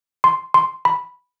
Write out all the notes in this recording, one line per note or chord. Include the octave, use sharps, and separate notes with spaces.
C6
C6
B5